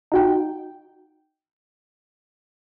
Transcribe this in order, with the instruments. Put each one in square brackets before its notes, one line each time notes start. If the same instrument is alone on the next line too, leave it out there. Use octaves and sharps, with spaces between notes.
[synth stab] D#4 F#4 G5